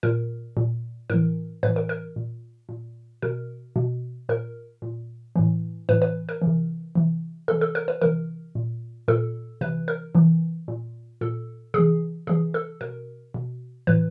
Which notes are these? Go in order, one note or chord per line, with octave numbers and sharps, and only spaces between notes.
A#2 A#4
A#2
A2 E3 A#4
A2 E3 B4
A#4
A#4
A#2
A#2
B2 A#4
B2
A#2 A#4
A#2
A2 E3
A2 E3 B4
B4
A#4
E3
C3
C3 E3
C3 E3 A4
A4
A#4
B4
C3 E3 A#4
A#2
A#2 A4
C3 E3 B4
A#4
C3 E3
A#2
A#2 A4
C3 E3 G#4
C3 E3 G#4
A4
B2 A#4
B2
A2 E3 B4